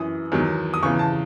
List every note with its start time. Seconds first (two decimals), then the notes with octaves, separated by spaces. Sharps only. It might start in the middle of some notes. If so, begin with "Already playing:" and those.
Already playing: F#2 E3 D#6
0.32 E2 D#3 F#3
0.74 D#6
0.83 E2 C#3 E3 C#6
0.99 A5